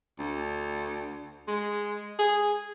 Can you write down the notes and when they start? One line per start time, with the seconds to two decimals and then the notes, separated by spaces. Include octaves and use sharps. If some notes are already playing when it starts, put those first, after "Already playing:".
0.19 D2
1.48 G#3
2.19 G#4